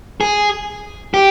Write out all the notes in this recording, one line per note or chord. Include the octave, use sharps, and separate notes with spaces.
G#4
G4